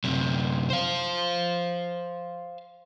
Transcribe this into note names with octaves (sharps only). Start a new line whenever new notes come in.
F#2 C3
C5 F5